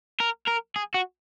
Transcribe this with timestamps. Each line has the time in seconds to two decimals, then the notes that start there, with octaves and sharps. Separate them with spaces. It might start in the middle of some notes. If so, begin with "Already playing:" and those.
0.20 A#4
0.48 A#4
0.76 G#4
0.94 F#4